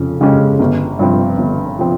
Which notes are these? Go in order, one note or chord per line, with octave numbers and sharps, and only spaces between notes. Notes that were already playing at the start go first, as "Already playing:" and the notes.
Already playing: F2 C#3 C#4
C#3 G#3 C#4 G4
G1
G2 F3 C4
G1
F3 C4